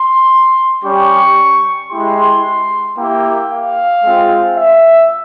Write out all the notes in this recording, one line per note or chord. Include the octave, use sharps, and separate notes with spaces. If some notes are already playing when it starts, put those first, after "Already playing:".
Already playing: C6
G3 C#4 G4 C#6
G#3 E4 G4 C6
A#3 E4 G4 G5
F5
G#3 C4 F4
E5